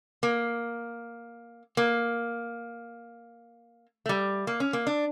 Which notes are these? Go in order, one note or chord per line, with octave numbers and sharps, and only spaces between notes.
A#3
A#3
A3
G3
A#3
C#4
A#3
D4